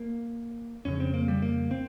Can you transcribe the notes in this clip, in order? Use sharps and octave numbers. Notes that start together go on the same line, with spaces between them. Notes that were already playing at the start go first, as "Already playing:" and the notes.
Already playing: A#3
F2 C#3 C#4
C4
A#3
G3
A#3
C4